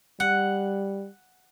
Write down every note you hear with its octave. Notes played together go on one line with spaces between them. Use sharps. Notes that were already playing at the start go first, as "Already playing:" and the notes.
G3 F#5